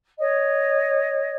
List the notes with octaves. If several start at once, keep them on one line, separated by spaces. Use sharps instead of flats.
C#5 D#5